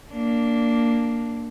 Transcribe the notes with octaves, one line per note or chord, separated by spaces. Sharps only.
A#3 D4